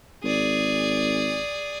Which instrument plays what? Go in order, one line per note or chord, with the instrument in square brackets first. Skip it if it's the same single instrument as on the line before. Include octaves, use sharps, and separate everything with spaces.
[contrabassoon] G#1 [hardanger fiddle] G#4 D5